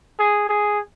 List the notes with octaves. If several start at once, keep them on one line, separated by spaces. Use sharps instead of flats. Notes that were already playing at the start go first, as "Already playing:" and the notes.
G#4
G#4